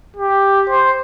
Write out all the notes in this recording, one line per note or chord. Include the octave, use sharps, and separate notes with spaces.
G4
C5